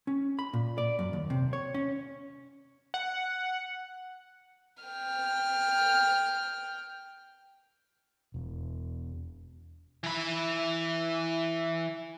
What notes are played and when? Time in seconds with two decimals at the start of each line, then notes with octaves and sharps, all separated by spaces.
0.07 C#4
0.39 B5
0.53 A#2
0.78 D5
0.99 F#2
1.13 D#2
1.30 C3
1.53 C#5
1.74 C#4
2.94 F#5
4.84 G5 F6
8.34 E1
10.04 E3 B5